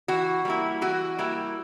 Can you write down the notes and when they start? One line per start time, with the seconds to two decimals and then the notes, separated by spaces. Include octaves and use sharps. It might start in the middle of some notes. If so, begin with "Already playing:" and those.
0.08 E3 F#4
0.45 G3 A#3 E4
0.81 E3 F#4
1.19 G3 A#3 E4